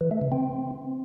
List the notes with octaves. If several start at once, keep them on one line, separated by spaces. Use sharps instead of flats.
E3
A3
C#3
C4